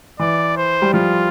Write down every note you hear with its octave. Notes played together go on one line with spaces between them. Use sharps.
E3 D5
C5
G3
F3 F4